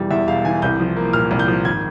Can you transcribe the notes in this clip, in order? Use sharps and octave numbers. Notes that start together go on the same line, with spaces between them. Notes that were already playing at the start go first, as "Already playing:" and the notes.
Already playing: E1 E3 G3
E2 E5
E1 F5
E3 G#5
C2 G6
F3
A#3
A#2 F6
C2
G6
F3
G#1 G#6